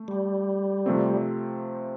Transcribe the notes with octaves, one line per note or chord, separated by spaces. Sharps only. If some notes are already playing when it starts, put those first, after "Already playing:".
Already playing: A3
G3
C3 F3 A3 C4